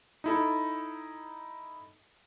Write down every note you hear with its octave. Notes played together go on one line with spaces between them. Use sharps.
D#4 E4 A4